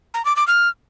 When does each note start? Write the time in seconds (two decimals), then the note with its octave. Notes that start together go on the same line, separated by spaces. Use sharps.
0.14 A#5
0.25 D6
0.36 D6
0.47 F6